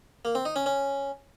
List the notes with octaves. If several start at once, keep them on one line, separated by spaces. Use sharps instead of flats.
A#3
C4
D#4
C#4
C#4